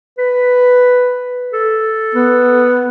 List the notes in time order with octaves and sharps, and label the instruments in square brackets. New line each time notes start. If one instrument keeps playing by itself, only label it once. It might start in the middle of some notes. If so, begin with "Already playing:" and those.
[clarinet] B4
A4
[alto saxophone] B3